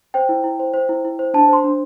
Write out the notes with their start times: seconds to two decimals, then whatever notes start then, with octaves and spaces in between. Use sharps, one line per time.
0.14 C5 G5
0.29 E4
0.44 E4
0.60 C5
0.74 C5
0.89 E4
1.05 E4
1.19 C5
1.34 D4 A5
1.49 C5 C6
1.64 D4